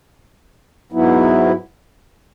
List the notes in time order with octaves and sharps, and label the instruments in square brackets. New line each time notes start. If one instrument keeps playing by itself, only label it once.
[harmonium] G#2 F#3 B3 E4